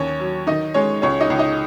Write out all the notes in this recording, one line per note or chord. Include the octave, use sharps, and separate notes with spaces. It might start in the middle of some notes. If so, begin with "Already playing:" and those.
Already playing: D#2 C#4 C#5
F#3
D#3 D#4 D#5
G#3 C#4 C#5
C#2 C#4 C#5
D#4 D#5
C#2
D#4 D#5